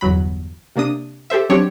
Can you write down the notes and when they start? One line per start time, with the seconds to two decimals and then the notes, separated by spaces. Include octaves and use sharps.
0.01 G1 E2 F#3 B5
0.76 C3 A#3 D4 D#6
1.30 G4 A4 C5 E5
1.50 F#3 C4 D4 G4 C#5